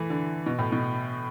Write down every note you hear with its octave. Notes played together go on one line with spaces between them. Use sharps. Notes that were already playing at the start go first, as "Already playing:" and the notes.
Already playing: E3 A3
D3
B2
A2
B2